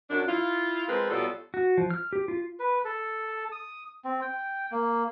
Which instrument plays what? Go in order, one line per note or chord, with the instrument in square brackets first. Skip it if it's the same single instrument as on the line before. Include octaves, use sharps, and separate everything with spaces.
[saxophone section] F#2 D4
E4 F4
F3 G#3 C4 A#4 B4
B2 F#3 G3 F4 A4
[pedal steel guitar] F#4
F3
F6
G4
F4
[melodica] B4
A4
D#6
C4
G5
A#3